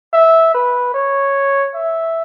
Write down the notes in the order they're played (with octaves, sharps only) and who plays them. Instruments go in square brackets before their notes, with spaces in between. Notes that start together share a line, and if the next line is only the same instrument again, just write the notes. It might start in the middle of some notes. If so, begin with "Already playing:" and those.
[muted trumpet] E5
B4
C#5
E5